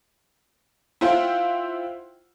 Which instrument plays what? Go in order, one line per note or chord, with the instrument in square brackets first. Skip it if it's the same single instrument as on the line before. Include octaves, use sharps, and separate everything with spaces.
[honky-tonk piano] E4 F4 C5 F#5 G5